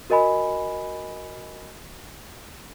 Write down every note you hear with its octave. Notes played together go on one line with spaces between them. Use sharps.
F#4 A#4 D#5 G#5 B5